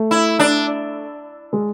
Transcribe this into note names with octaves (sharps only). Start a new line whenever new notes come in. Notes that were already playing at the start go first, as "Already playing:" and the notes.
Already playing: A3
E4
D4
G#3